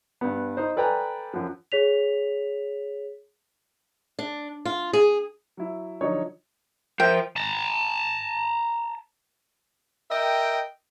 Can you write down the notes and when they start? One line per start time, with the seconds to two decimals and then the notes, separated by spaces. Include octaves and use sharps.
0.21 G2 B3
0.57 D#4 C5
0.76 A4 B4 D5 G5 G#5 A#5
1.34 F#2 F3
1.72 G#4 C#5 B6 F7
4.19 D4
4.65 F4
4.93 G#4
5.57 F#3 E4
6.01 D3 F3 F#3 D#4 C#5 D5
7.00 F3 A#4 C5 E5 G5
7.36 A5 A#5
10.11 A#4 D#5 E5 G5